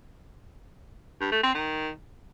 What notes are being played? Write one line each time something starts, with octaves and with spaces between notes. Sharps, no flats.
G2
A3
C4
D#3